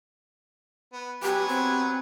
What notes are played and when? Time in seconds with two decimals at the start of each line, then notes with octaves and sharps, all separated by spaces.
0.93 B3
1.23 F#3 B3 G4 G#5
1.48 C4